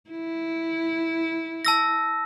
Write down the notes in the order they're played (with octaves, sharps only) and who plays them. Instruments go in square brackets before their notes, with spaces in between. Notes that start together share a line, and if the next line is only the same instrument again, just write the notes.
[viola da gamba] E4
[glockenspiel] A5 E6 A#6